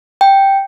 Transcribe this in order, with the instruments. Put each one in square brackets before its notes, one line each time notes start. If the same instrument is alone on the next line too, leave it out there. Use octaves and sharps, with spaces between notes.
[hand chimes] G5